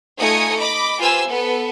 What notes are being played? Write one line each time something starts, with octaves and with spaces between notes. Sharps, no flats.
A3 D#4 F4 G#5 D#6 C#7
D#5 B5 D6
F4 G4 B4 C5 G#5 E6
B3 A4 B4